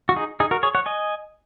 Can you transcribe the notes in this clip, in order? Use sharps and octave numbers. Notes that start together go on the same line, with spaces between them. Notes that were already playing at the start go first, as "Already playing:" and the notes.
F#4
D#4 G#4
D#4 G#4
F#4 A#4
G#4 C#5
C#5 F#5
D#5 G#5